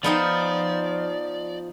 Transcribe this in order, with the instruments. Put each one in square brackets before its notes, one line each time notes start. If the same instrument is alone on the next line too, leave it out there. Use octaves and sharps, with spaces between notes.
[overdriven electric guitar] F3 [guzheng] B3 D#4 G5 [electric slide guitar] D5